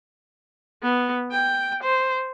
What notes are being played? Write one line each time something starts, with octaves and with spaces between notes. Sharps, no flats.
B3
G5
C5